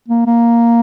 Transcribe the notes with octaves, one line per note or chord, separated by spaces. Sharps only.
A#3
A#3